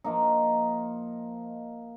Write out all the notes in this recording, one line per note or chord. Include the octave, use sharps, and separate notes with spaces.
F3 A#3 D#4